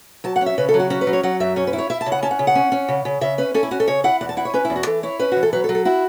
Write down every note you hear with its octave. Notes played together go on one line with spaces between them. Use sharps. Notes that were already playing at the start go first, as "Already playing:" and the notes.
F#3 A5
F#5
C#4
E5
C#3 B4
A4
F#3
F#4
C#4 F#4
B4
F#3
C#5
F#3 F#5
F#2 E5
C#4 C#5
B4
E4
C#5
E4 E5
A5
C#3
F#5
C#4 A5
F#5
C#3
F#5
C#4
C#4
C#3
C#3
C#3 E5
C#4 B4
C#4 A4
E4
C#4 F#4
A4
C#3 C#5
E4 F#5
E2 F#5
A5
E4 F#5
C#5
C#4 B4
E4
E2
F#4
E3 A4
E4 C#5
C#4 B4
E3 F#4
A4
F#3 B4
A4
F#3
A4
E4 F#4